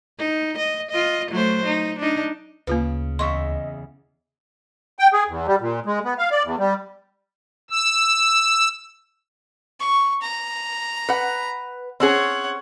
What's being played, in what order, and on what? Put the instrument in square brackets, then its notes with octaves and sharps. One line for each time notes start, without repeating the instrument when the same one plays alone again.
[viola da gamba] D#4
D#5
F4 D#5
F#3 A3 C5
D#4
D4 D#4
[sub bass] D2 [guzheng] C#3 [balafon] A#3 F4 B4
[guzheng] E2 C#3 E5 [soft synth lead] D#5 [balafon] C6 C#6
[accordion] G5
G#4
E2
G3
A#2
G#3
B3
F5
D5
E2
G3
[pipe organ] E6
[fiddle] C#6
A#5
[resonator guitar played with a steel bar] B4 F#5
[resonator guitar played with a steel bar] C4 C#4 G#4 [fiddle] C#5 F#5